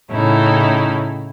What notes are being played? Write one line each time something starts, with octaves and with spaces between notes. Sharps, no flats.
A2 C#3 C#4 D#4 E4